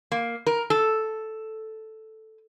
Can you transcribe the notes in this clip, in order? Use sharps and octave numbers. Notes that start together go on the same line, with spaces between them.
A#3
A#4
A4